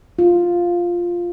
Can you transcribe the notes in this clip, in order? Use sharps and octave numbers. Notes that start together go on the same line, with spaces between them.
F4